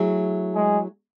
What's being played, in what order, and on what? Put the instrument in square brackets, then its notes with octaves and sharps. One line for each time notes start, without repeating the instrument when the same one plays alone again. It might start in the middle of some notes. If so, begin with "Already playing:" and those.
Already playing: [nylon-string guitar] F#3 A3 E4 G#4
[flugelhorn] G#3